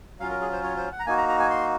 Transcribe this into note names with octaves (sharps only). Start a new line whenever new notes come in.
F#3 C#4 F4 F5
A#4
G#4
C5
C#5
C5
F#5
A#5
A#3 D#4 F#4 G#5
A#5
A#5
G#5
C6